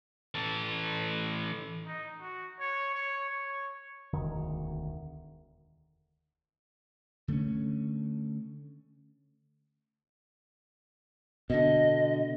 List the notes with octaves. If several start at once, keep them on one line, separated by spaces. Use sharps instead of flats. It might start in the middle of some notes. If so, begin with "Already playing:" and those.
E3 A4
D#4
F#4
C#5
C#5
C#5
E1 D2 D#3
D3 A3 C4 C#4
B2 D3 D#5